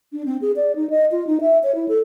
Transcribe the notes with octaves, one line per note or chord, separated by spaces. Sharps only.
D4
C4
G#4
D5
D#4
D#5
F4
D#4
E5
C#5
E4
A4